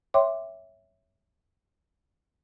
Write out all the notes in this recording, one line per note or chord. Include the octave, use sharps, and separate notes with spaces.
C#5 E5 G5 C6 D6